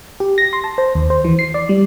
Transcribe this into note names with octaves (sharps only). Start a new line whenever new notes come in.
G4
A#6
C6
A5
C5
D#2
C5
E3
C7
D5
G3